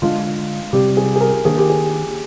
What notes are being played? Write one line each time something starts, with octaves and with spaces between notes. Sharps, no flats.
D3 G#3 D4 F4
C3 G3 C4 G4
G#4
G#4
A#4
D#3 A#3 D4 G#4
G4
G#4